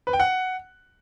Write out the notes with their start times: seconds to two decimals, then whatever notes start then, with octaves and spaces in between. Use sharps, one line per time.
0.07 B4
0.13 G5
0.20 F#5